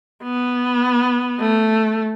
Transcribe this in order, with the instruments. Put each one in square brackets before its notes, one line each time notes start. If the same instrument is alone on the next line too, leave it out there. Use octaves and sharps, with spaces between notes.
[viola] B3
A3